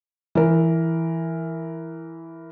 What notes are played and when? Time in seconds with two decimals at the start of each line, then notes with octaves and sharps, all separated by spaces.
0.35 E3 A#4